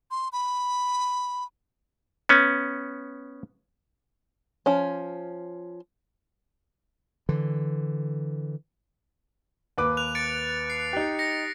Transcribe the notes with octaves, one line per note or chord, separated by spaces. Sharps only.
C6
B5
B3 C#4
F3 C#4
D3 E3
D#2 B4 D6
F#6 F7
A6 C#7 D7
C7
D#4 G4
A#6 C#7